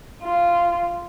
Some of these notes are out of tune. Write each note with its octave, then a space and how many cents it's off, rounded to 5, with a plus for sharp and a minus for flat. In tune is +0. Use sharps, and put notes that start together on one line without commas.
F4 -10